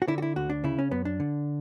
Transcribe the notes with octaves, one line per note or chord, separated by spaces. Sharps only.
F#4
D3 E4
F#4
E4
D2 F#4
D4
C#3 E4
C#4
F#2 B3
D4
D3